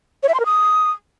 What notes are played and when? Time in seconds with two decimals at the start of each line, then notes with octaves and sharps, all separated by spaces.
0.23 C#5
0.29 E5
0.34 C6
0.40 A#4
0.46 D#6